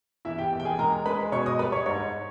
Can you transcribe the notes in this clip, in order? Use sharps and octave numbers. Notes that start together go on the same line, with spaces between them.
E2 E4 E5
G4 G5
E2
G5
G#4 G#5
G#3 A#4 A#5
G#3 B4 B5
B2 C#5 C#6
D#5 D#6
G3 B4 B5
C#5 C#6
G#2 C#5 C#6